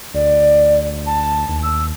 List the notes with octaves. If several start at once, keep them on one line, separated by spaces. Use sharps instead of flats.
D2 D5
A5
D#2
E6